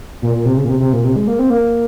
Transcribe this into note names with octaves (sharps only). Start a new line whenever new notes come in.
A#2
A#2
C3
C#3
A#2
C3
C3
A#2
C3
G#3
A#3
C4
A#3